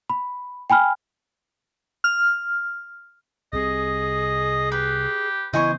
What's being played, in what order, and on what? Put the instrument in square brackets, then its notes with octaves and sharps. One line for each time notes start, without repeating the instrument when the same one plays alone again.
[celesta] B5
G5 G#5 B5 F6
[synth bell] F6
[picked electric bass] C2 C3 [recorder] G#4 [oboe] D#5
[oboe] G4 [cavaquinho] B4
[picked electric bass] C#3 E3 B3 [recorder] E4 [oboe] C5 [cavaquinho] D#5 G#5 C#6